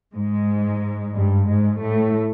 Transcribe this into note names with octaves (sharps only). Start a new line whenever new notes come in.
G#2 G#3
G2 G3
G#2 G#3
A2 A3